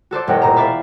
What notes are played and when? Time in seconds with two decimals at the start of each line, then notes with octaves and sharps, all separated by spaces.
0.11 F#4 A4 C5 D5
0.27 E1 F#5 G5 A#6
0.42 A#2 C5 A#5
0.56 D5 E5 F5 B5